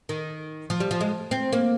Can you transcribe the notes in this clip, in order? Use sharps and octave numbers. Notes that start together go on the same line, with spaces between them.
D#3
F3
G3
F3
G#3
C4
A#3